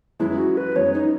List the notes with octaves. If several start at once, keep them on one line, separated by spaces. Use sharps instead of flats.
F#2 E3 G#3 B3 E4
F#4
B4
F#2 E3 G#3 B3 C#5
D#4